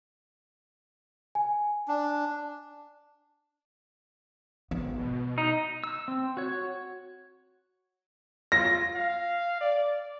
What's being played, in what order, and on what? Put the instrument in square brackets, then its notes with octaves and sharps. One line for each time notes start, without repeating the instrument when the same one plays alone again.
[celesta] G#5
[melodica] D4
[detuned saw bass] G#1 [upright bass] B3
[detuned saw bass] B2
[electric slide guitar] D#4
[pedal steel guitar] E6
C4
F#4 C#5
[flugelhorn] F4 [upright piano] A#6
[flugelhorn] F5
D5